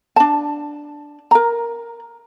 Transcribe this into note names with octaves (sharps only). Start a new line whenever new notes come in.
D4 A5
A#4 A#5